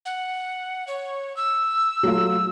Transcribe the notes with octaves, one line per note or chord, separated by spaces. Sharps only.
F#5
C#5
E6
F#3 A3 F4